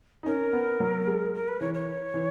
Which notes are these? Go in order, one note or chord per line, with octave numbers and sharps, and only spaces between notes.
D#4
C#4 A#4
B3
F#3
G#3
A#4
B4
E3 C#5
C#5
E3